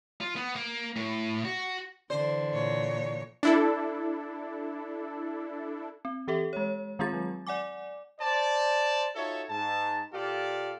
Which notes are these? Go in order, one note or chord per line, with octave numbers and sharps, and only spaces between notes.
F4
B3
A#3
A2
F#4
D3 E3 C5 D5
A#2 C#5
D4 E4 A4
C4
E3 G4 A4 E5
G#3 C#5
D#3 G#3 C4 F4 G#4 A6
F#3
D5 F#5 G#5 D6
C5 D5 A5
D#4 F4 F#4 A4 C#5 E5
G#2 A5
A#2 F4 G4 A4 D5 F5